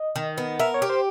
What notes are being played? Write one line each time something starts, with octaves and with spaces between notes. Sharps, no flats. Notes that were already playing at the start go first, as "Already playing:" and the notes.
Already playing: D#5
D#3
B3
A#4 E5
C#5
G4
C5